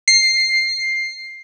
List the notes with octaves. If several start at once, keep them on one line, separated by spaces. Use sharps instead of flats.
C7